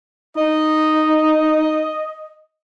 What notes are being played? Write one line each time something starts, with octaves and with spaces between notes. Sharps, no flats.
D#4 D#5